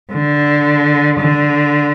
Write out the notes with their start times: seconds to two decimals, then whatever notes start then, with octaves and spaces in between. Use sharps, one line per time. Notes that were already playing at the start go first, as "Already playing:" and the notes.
0.12 D3
1.20 D3